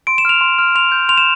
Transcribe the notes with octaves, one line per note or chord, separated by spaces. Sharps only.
C6 D7
E7
F6 F7
C6
F6
C6 F7
G6
C6 F7
E7